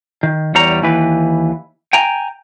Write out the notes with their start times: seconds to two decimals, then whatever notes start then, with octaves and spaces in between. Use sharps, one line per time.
0.23 D#3
0.55 E2 G3 C#5 A#5
0.82 D#2 E3 B4
1.93 G5 G#5 A#5